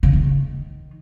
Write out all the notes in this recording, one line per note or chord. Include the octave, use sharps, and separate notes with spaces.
C#3
D#3